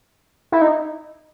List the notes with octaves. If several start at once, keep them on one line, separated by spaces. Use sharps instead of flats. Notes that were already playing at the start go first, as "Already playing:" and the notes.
E4
D#4